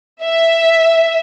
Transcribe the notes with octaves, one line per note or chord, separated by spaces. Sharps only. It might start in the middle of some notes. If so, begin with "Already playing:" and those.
E5